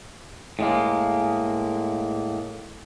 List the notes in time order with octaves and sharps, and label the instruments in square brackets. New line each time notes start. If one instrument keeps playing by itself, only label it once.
[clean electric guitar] A2 G#3 A#3